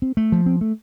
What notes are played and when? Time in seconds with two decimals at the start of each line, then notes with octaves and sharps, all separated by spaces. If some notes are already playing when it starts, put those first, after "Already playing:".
0.02 C4
0.17 A3
0.32 F3
0.46 C4
0.61 A3